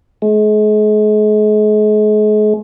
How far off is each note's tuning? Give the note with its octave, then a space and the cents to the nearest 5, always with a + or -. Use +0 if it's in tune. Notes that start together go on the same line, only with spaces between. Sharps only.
G#3 +40